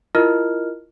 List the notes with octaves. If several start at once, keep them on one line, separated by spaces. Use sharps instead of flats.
E4 F4 A#4 D#5 F6